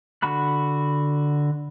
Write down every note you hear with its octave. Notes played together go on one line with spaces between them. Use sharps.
D3 F#4 B5 F#6